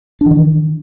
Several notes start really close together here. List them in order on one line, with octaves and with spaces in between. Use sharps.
D4 E3 D#3